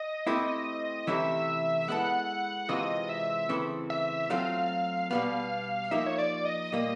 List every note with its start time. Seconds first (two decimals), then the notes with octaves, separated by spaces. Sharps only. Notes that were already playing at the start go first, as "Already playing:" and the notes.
Already playing: D#5
0.27 A3 C4 E4 G4
1.07 C3 E3 A3 C#4 E4 E5
1.88 G#3 B3 E4 A4 F#5
2.69 C3 E3 G#3 C4 F4 D#5
3.09 E5
3.49 C#3 E3 A3 C4
3.90 E5
4.30 F#3 A3 C4 F4 F5
5.11 B2 G3 B3 F5
5.91 F3 A#3 D#4 G4 E5
6.06 C#5
6.18 D5
6.45 D#5
6.72 A#2 G3 A#3